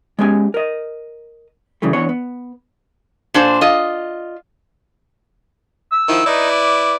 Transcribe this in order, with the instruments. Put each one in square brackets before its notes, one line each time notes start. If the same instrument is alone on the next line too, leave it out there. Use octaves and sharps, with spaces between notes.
[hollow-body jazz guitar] G#3 B3 C#4 G4 G#5
A#4 D#5
F#2 C#3 E3 G3 A3
E3 B3 D4 C#5
B3
[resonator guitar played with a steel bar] A#2 D4 C5
F4 D#5
[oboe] E6
[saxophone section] D#3 F3 E4
[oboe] D#4 [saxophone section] E4 B4 D5
[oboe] D6